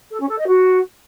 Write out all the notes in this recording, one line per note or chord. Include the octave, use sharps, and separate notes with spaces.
A4
C#4
A4
D#5
F#4